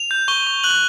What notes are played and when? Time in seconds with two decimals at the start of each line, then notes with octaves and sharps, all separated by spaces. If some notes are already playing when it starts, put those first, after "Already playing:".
Already playing: F7
0.11 G6
0.28 C#6 G7
0.47 C#6
0.63 F#6 F#7